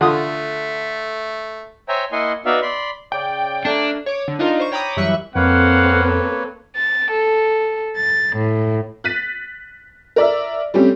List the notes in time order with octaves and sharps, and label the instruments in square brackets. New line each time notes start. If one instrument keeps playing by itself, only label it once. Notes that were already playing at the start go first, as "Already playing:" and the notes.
[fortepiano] D3 F4 D#6 [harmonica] A3
[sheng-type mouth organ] C5 C#5 E5 G5 G#5 A#5
A#3 E4 D#5 F#5 G#5 C6
B3 D#4 F#4 D5 E5 F5
D5 B5 C6
[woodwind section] C#3 D5 [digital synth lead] G5
[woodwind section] A3 A#3 [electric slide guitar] D4
[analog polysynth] C#5 D6
D3
D4 D#4 F4 A#4
C5 C#6
C#5 G5 A#5 B5 D6 D#6
F#2 E3 G3 E5 C#6 F#6
[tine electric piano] F2 [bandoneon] A#3 B4 C#5 [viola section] C4 A4 [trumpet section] F5 F#5
[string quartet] A6
A4
A6
A2
[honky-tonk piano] F#6 A6 B6 D#7
A#4 D5 E5
G3 A3 C4 C#4 G4